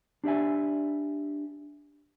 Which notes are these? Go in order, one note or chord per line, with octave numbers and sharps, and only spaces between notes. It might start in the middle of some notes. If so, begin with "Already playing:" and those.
D4 G4 D5 E5 G#5